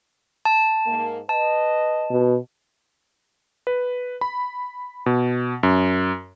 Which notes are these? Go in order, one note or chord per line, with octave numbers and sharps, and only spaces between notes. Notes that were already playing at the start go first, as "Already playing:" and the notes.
A5
G#2 A#3
B4 D#5 A5
B2
B4
B5
B2
F#2